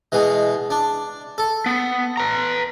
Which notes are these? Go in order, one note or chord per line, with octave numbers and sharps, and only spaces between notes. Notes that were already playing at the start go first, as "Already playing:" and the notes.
B2 E3 G#3
D4
A4
B3
B4 A#5